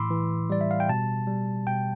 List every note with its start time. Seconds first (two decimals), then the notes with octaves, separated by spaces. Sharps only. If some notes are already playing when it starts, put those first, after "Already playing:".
Already playing: A2 E3 B5 C6 D6 E6
0.11 E3
0.50 G3 D5
0.61 E5
0.71 F5
0.80 G5
0.89 B2 A5
1.27 G3
1.67 B2 G5